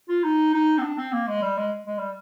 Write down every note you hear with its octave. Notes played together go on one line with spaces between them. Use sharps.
F4
D#4
D#4
C4
D4
C4
A#3
G#3
G3
G#3
G#3
G3